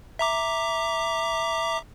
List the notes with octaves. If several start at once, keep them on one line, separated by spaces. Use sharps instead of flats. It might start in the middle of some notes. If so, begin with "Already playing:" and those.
E5 A#5 D6